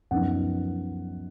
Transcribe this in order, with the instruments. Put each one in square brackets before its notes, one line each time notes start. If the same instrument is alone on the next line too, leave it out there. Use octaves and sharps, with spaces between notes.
[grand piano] F#2 F3 B3 D#4 F#5